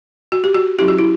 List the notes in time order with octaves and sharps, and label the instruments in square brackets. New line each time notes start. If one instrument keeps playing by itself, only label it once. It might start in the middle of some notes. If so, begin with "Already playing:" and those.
[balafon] F#4
G4
F#4
F#3 C#4 E4 G4
F#4
E4